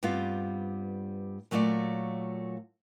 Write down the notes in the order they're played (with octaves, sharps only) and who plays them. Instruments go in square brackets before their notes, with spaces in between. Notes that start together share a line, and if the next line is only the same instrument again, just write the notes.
[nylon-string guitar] G2 G3 B3 C4 F4
A#2 F#3 A3 F4 D5